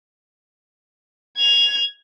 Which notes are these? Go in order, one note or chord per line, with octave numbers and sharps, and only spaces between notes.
G#6 F7